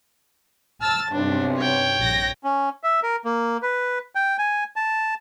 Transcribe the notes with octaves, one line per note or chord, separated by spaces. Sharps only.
A5 E6 F6 A6
B1 G2 C3 D4
C#5 G5
A#1 A#6
C#4
E5
A#4
A#3
B4
G5
G#5
A5